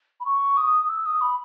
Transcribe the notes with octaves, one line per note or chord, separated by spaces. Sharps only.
B5
C#6
D#6
E6
D#6
B5